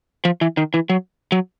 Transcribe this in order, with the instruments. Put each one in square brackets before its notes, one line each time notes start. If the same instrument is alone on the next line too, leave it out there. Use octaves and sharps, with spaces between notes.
[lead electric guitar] F3
E3
D#3
E3
F#3
F#3